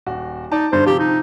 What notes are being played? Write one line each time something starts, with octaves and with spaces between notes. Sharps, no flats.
D#1 F#4
D#4 D5 A5
G2 D3 C5
C3 F3 G4
D#4